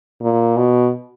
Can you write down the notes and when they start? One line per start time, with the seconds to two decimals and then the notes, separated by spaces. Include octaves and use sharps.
0.21 A#2
0.57 B2